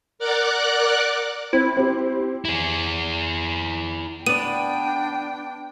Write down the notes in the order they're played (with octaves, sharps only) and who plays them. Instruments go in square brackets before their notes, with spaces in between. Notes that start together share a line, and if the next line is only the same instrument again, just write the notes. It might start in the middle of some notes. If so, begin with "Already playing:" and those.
[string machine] A#4 D5 F#5 D6 F#6
[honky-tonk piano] C4 [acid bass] E4
[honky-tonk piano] C4 G4
[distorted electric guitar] E4 G#4
[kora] B3 D5 [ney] D4 [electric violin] G5 [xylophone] D#7